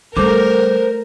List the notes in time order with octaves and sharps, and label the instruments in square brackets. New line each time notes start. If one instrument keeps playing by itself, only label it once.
[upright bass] G3 [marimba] A3 A4 D6 [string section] A#4 [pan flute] C5